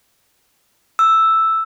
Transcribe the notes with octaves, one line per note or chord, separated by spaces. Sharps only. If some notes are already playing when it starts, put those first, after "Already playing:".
E6